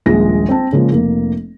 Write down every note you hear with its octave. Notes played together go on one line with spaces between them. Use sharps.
D#1 A#1 G#3 G#4 A#6
C4 A5
C#3 F3 G#3 A#3
F1 A#3